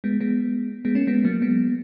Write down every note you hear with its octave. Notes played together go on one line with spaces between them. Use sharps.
G#3 B3
G#3 B3
G#3 B3
A#3 C#4
G#3 B3
F#3 A#3
G#3 B3